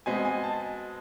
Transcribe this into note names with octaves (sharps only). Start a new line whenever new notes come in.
B2 G#3 C4 G#5
G#5
A5